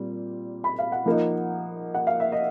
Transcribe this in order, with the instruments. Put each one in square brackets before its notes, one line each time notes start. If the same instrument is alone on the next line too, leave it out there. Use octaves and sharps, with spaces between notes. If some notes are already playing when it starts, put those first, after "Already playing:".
Already playing: [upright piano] A#2 G3 C4
B5
F5
F#5
F3 A#3 D#4
F#5
F5
E5
D#5